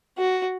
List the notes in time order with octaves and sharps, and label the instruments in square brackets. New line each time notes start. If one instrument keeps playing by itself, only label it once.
[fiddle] F#4